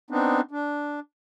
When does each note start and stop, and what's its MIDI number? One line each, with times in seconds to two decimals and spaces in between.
0.10 0.41 59
0.10 0.41 60
0.10 0.41 62
0.10 0.41 63
0.51 1.00 62